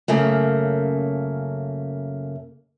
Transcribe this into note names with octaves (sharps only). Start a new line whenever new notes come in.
F#2 C#3 A3 A#3